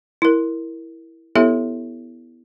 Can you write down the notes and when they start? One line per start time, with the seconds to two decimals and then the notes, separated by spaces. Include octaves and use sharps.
0.22 E4 A#4
1.35 B3 E4 G4 A4 C#5 E5